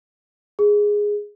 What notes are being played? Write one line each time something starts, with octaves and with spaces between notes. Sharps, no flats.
G#4